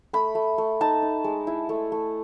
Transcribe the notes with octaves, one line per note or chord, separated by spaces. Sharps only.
A3 B5
A3
A3
D#4 A5
D#4
G#3
E4
A3
A3